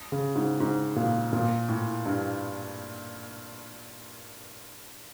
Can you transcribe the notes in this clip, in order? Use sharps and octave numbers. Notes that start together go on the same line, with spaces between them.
C#3
G#2
G#2
A#2
A#2
A2
G2